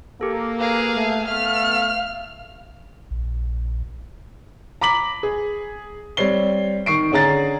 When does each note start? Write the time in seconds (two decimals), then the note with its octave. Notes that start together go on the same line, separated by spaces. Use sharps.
0.21 A#3 G4 A4
0.59 G#4 A4 B4 F5 A#5
0.93 A3
1.28 A3 B3 E5 F5 F6
3.11 A#1
4.81 A#5 B5 D6 B6 F#7
5.23 G#4
6.17 G3 C4 C#5 C7 G7
6.86 D#3 C#6 C7 D7
7.12 D3 C#4 G#4 A#5 A6